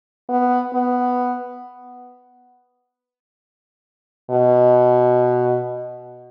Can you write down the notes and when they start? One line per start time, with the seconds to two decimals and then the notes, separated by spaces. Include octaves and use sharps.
0.29 B3
0.74 B3
4.31 B2